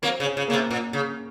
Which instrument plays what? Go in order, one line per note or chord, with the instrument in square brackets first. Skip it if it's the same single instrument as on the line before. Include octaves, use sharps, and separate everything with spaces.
[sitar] F#3 A#3 [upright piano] C4
[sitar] C#3
[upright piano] C#4
[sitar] C#3
[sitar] C#3 [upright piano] A#3
[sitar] C3
A#2
C#3